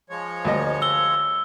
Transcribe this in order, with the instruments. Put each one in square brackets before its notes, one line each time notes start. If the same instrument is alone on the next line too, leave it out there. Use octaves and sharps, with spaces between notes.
[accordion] F3 G#3 C#5
[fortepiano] D2 A#3 D#5
[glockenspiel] E6 G7